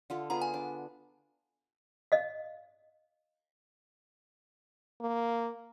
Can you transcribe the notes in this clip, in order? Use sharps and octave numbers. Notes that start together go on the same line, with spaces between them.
D3 F4 A4
B3 F4 G#4 A#5
G#5
D4
D#5 F5
A#3